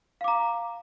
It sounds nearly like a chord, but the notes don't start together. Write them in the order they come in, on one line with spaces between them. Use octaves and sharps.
F5 D6 A#5